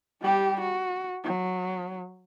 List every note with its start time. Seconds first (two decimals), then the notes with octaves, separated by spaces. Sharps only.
0.21 G3 G4
0.61 F#4
1.24 F#3